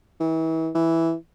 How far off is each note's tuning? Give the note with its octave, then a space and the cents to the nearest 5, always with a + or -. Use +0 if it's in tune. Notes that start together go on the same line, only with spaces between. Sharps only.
E3 -35
E3 +0